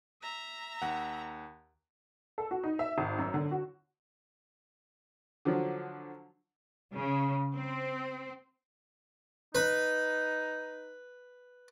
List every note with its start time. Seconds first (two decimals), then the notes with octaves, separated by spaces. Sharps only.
0.22 E5 A#5
0.82 D#2 F#5
2.38 A4
2.51 F#4
2.63 D#4
2.79 E5
2.98 G#1
3.18 F#2
3.34 D3
3.51 F#4
5.45 D3 F3 F#3
6.94 C#3
7.54 C4
9.55 D#4 B4